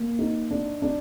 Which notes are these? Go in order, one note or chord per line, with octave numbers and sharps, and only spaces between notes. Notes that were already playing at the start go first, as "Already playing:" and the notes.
Already playing: A#3
D#4
D4
D4